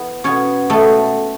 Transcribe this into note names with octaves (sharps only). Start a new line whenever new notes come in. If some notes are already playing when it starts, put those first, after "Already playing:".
Already playing: E3 B3
B2 B3 C#4 C#5
B2 A3 B3 A4